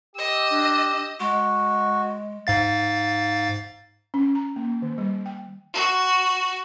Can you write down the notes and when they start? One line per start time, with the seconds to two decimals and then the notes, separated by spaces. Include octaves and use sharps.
0.16 G4 D#5 E6
0.51 D4
1.20 G#3 F#4
2.47 G#2 F5 A6
4.14 C#4
4.35 A#5
4.56 A#3
4.82 D#3
4.98 G3
5.26 G5
5.74 F#4